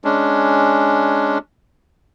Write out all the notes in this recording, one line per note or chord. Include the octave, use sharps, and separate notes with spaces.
G#3 C#4 D4